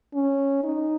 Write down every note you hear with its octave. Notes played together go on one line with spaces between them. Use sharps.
C#4
D#4